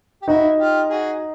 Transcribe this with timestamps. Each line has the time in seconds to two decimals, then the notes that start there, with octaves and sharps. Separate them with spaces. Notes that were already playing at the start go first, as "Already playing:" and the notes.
0.22 G4
0.28 D#4 E4 F#4
0.58 F4 G4
0.90 F#4 G#4